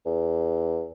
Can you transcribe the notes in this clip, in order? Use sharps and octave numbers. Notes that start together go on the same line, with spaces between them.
E2